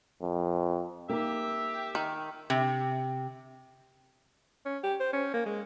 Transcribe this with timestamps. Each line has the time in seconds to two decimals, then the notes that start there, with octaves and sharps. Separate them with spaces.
0.22 F2
1.09 A#3 D#4 G4 E5
1.95 D#3
2.50 C3
4.65 C#4
4.84 G4
5.00 C5
5.13 C#4
5.34 A#3
5.46 G#3